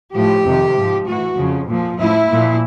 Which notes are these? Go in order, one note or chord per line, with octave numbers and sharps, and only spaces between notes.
A2 F3 G4
F2 C3 D#3
G#2 F3
A2 E3 F#4
F2 C#3 F3
A#2 F3
A2 F3 E4
A#2 F3